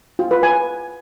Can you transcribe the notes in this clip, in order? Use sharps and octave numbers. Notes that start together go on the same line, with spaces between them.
F4
B4
G#5